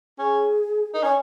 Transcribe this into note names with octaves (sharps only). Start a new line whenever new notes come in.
C#4 G#4
D#4 A#4
C#4 C#5